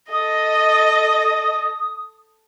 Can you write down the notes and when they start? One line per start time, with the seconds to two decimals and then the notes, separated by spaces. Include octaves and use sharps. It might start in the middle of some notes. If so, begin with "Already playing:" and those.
0.12 A4 D#5 D#6